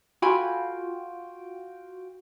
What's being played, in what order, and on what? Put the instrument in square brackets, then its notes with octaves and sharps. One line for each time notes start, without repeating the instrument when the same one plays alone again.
[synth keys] F4 F#4 G5 [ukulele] A4 G#5 B5